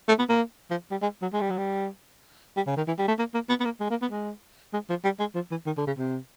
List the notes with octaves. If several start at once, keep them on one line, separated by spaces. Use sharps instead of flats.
A3
B3
A#3
F3
G3
G#3
F#3
G#3
G3
F#3
G3
G3
C#3
D#3
E3
G3
A3
A#3
A#3
B3
B3
A#3
G#3
A#3
B3
G#3
G#3
F3
G3
G#3
F3
E3
D#3
D3
C#3
C3